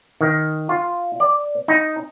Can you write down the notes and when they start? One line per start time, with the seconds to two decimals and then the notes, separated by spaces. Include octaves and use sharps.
0.21 D#3
0.69 F4
1.20 D5
1.68 D#4